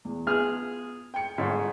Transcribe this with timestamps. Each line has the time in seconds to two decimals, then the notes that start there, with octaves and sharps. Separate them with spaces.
0.05 E2
0.27 B3 F4 G#4 F6
1.14 G5 C#7
1.38 G1 G#2 C#5